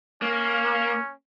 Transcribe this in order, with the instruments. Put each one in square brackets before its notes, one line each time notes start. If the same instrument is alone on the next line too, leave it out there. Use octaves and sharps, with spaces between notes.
[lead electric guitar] A#3 [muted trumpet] C#4